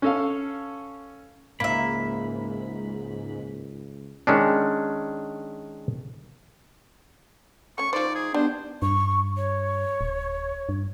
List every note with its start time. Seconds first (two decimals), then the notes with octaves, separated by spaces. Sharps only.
0.02 C#4 A4 F5
1.60 C#2 G#2 A#3 E5 B5
4.27 D#3 G#3 C#4 D4
7.78 A3 C#4 C#6
7.93 F3 D#4 C5 D5
8.15 G#4
8.34 G3 B3 D4 C5
8.82 G2 C#6
9.37 C#5
10.01 D1
10.69 G2